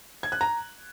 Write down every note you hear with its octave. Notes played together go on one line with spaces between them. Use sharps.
G#6
F#6
A#5